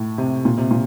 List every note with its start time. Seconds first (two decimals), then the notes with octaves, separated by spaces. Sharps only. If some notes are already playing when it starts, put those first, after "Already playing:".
Already playing: A2
0.18 C3
0.45 A#2
0.58 C3
0.71 A#2